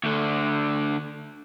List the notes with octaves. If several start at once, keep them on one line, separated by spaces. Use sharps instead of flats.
D2 D3